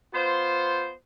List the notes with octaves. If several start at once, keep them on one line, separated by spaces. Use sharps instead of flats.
B3 F4 C5